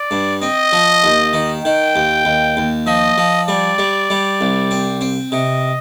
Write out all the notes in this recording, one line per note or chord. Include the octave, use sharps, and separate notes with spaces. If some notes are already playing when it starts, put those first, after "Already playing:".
Already playing: D5
G2
C4 D#5
F3
D#2
D#3
D#3 G5
D#2
D#2
D#2
F3 D#5
F3
G3 D5
G3
G3
C2
C4
C4
C3 D#5